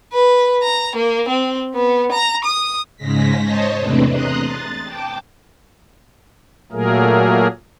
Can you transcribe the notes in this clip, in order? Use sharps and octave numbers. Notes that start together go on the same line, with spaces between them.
B4
A#5
A#3
C4
B3
A#5
D#6
G#2 C#3 G#3 A#6 B6
C5 C#5 D#5 A5
E2 C3 A3 C4 D4 B4
A#5 C6 D#6 F#6
A6
G5 A5 D6
A#2 F#3 A3 A#3 G#4 A#4